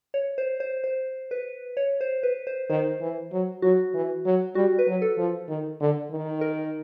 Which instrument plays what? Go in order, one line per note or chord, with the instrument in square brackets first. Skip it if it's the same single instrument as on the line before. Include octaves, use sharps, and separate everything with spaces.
[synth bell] C#5
C5
C5
C5
B4
C#5
C5
B4
C5
[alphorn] D#3 [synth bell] C5
[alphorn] E3
F#3
[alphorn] F#3 [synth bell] F#4
[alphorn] E3
F#3
[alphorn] G3 [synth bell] F#4
[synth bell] B4
[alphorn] F#3
[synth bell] A4
[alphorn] F3
D#3
D3
D#3
[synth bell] A#4